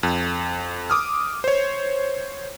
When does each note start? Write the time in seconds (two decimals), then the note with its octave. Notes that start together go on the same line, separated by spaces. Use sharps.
0.03 F2
0.90 D6 D#6 F6
1.44 C5 C#5